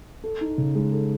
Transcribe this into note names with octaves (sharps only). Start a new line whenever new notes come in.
A4
D#4
C#3
G#3
A4